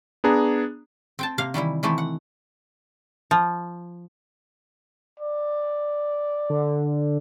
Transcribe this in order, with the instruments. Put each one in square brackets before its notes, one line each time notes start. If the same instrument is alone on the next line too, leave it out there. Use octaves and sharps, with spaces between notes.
[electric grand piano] B3 D4 G#4 A#5
[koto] C4 G5 A5
C3 A#3 F5
D#3 E3 G3 E4
D#3 E3 A3 C4 E4
F#5
F3
[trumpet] D5
[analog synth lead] D3